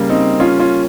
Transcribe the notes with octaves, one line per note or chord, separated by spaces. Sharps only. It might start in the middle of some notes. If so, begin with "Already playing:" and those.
Already playing: C#3 G3 A#3
C4 D#4
C#4 F4
C#4 F4